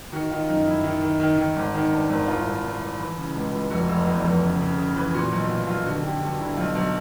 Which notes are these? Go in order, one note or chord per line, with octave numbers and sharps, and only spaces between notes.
D#3 F#4
D#3 F4
F#2 D#4
F#2 E4
D#3
D#3
D#3
D#3
G#1
D#3
G2
G#1
C2 F4
C2
C2
C2
E3
C#3
C#2
C#2
F1 F#4
F1
E2
F1
C#3
C#3
C#3
E3
A#2 F#4
B1 F#4
B1 F4
B1 F4
D3 F#4
D3 G4
G2 F#4
D3 E4
B1 F4
B1 F#4